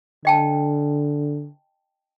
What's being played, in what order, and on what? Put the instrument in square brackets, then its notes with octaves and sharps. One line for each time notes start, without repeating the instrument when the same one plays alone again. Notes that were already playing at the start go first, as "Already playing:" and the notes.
[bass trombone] D3 [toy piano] D#5 G5 A5